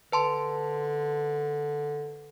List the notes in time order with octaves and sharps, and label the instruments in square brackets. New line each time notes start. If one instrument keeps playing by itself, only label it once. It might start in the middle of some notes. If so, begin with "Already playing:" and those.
[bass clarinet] D3 [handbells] B4 A5 C6